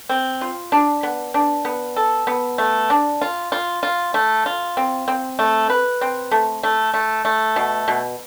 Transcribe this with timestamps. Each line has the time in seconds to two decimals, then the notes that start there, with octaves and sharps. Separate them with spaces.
0.09 C4
0.41 F4
0.72 D4
1.03 B3
1.34 D4
1.65 B3
1.96 A4
2.27 B3
2.58 A3
2.90 D4
3.21 F4
3.52 F4
3.83 F4
4.14 A3
4.46 F4
4.77 C4
5.08 C4
5.39 A3
5.70 B4
6.01 C4
6.31 A3
6.63 A3
6.94 A3
7.25 A3
7.56 B2
7.88 B2